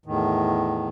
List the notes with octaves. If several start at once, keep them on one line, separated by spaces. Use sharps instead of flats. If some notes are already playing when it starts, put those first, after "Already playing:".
E2 A2 D#3